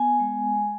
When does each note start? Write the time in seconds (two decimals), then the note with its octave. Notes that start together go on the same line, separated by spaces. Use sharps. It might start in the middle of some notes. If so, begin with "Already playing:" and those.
Already playing: B3 G#5
0.20 G#3
0.54 G#3